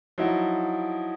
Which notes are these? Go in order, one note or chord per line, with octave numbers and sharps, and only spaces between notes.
F3 F#3 D#4 E4